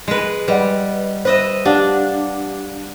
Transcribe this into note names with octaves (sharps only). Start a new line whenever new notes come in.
G#3 B4
G3 B4 D#5 F#5
B4 C5 D#5 E5
D4 G4 F5 F#5